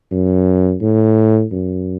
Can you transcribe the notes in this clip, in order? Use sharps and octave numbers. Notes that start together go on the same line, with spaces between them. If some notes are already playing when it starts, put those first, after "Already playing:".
F#2
A2
F#2